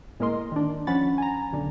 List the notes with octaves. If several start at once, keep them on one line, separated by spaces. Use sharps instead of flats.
A2 G#3 A#3 A#4 D#5 C6
D#3 D4
F3 C#4 F#5 B5 A6
G#5 A#5
B1 D3